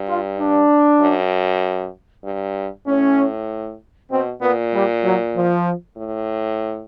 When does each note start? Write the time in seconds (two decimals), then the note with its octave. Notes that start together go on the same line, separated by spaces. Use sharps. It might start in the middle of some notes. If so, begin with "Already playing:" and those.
Already playing: G2
0.08 F4
0.39 D4
1.01 F#2
2.24 G2
2.87 A2 C#4
4.11 B2 C4
4.41 A#2 B3
4.73 G3
5.04 F#3
5.34 F3
5.97 A2